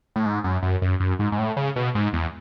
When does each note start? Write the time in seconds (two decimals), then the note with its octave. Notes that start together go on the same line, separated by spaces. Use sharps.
0.16 A2
0.26 G#2
0.44 F#2
0.63 F#2
0.82 F#2
1.00 F#2
1.19 G#2
1.32 G#2
1.39 A2
1.57 C#3
1.76 B2
1.95 G#2
2.13 E2